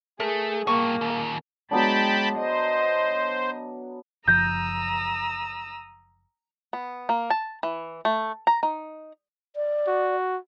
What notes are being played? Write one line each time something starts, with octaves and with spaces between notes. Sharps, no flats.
A3 G#4 A#4
G2 A#2 A#3 C#6
D#2 A#2
F#3 G#3 B3 D4 G5 A5 B5
C5 D#5
F#1 F3 A#5 D#6 E6 G6 A#6
B3
A#3
A5
E3
A3
A#5
D#4
D5
F#4